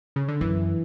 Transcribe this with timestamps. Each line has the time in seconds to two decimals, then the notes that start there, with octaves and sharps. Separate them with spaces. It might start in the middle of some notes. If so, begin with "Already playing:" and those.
0.16 C#3
0.28 D3
0.41 F#2 E3